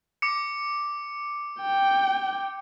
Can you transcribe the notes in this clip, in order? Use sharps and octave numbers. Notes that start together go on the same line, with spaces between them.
D6 C#7
G5